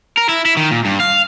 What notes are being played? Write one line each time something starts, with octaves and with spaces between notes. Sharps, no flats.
A#4
E4
E4
D#3
A#2
G2
F5